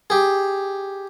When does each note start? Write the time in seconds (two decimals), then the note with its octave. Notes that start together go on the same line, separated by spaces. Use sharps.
0.10 G4 G#4